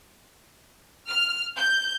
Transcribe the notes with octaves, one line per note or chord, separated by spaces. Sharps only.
F6
G6